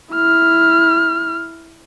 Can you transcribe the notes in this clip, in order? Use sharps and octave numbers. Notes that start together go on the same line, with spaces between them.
E4 F6